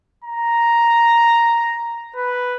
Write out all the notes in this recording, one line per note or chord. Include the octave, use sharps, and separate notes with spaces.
A#5
B4